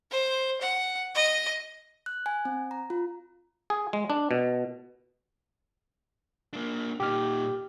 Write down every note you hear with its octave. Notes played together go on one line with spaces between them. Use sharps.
C5
F#5
D#5
F#6
G#5
C4
A#5
F4
G#4
G#3
D4
B2
A#3 D4
A#2 D#4 G4 F6